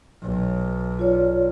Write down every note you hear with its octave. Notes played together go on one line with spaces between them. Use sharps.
B1
F4 C#5 D5